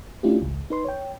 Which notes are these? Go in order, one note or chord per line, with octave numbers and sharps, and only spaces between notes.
A3 C#4 D4 E4 F4 G4
G#1 C#2
D#4 B4 C6
C#5 G5